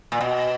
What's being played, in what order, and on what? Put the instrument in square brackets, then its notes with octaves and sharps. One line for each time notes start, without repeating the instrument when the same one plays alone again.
[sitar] A#2
B2